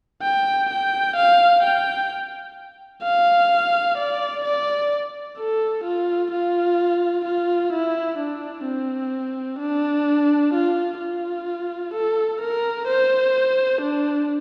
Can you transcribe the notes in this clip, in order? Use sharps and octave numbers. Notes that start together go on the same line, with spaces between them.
G5
G5
F5
G5
F5
D5
D5
A4
F4
F4
F4
E4
D4
C4
D4
F4
F4
A4
A#4
C5
D4